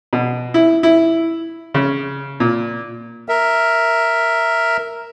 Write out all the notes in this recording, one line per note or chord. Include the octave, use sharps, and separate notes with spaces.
B2
E4
E4
C#3
A#2
A#4 E5